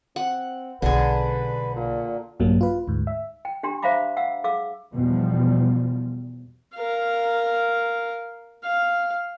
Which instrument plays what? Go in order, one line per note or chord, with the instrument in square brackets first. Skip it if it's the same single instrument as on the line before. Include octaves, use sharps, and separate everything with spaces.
[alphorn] C4 [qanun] F#5
[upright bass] B1 [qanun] D3 G#4 [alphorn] B4
[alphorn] A#2
[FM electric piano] A#1 G2 A#2 F#3 G3 A#3
F4 B4
D2 G#2
E5
[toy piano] G5
D4 G4 A#5 C6
C5 E5 F5 A#5 B5 D6
F5 F#5 E6
G#4 F5 D6 E6
[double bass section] E2 B2 F3 G3
[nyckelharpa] A#4 F5
F5